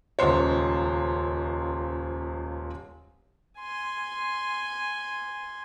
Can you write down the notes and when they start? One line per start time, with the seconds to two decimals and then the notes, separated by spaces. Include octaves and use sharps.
0.19 D#1 C#2 C5 C#5
3.59 G#5 C6